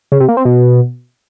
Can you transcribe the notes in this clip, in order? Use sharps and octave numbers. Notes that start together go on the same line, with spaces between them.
C#3
C3
A#3
C4
B2